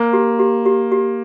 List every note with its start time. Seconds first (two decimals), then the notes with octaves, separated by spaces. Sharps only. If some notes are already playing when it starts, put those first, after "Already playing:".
Already playing: A#3 C5
0.13 G4
0.39 G4
0.66 G4
0.92 G4